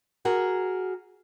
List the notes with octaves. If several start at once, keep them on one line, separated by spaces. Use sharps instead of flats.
F#4 G#4 A#4